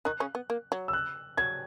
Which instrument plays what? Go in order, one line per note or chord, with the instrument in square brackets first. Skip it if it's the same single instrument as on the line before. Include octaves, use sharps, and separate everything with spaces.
[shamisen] D#3 D#4 [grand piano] F#6
[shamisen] C#3 C#4
B3
A#3
F#3
[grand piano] E6
F#6
[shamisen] F#3 [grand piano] G#6